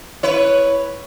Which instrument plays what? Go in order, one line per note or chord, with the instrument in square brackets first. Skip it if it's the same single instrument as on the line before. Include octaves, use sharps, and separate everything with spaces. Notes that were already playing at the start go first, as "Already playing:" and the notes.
[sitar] E4 B4 C#5